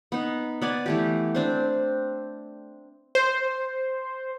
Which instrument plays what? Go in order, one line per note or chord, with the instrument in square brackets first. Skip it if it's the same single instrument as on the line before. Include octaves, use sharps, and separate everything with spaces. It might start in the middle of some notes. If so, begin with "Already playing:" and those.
[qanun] B3 D#4
B3 D5 G#5
E3 A3 G4
C4 D4 C5
[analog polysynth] C5